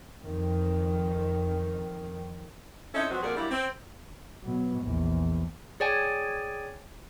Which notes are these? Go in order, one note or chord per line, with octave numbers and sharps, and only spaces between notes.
F2 D#3
C4 C#4 D#4 E4 A4
F3 F#3 B3 C4 F#4 C5
F2 A#2 F#4 G#4 A#4 D5
F#3 G3 A#3 D4 E4
C4
B2 F#3
A#1 E2
G#4 C#5 D5 G5 G#5